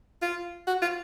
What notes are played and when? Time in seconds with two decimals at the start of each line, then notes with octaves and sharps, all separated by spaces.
0.22 F4
0.67 F#4
0.82 F4